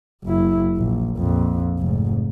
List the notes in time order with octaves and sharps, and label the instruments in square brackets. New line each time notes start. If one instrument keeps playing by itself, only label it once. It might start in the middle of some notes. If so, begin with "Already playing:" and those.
[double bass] F#1 E4
A#1
A#1 F2
F1 G#2